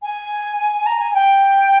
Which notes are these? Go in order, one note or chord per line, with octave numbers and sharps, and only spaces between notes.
G#5
A#5
G#5
G5